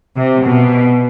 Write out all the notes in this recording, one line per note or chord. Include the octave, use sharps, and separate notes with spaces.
C3
B2